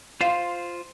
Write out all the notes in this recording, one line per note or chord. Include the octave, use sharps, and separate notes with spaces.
F4 C5 F5